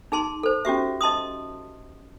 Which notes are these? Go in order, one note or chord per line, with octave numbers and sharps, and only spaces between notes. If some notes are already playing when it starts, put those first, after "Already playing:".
D#4 G#4 A5 C6
A4 C5
C#4 F#4 G4 E5
D#5 A5 C6 D#6